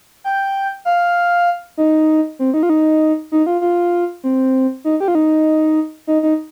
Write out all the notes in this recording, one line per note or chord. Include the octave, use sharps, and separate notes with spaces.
G5
F5
D#4
C4
D#4
F4
D#4
D#4
F4
F4
C4
D#4
G4
F4
D#4
D#4
D#4